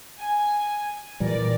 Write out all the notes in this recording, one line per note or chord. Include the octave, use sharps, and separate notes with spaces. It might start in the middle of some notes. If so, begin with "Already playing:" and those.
G#5
A#2 E3 G3 A#4 D5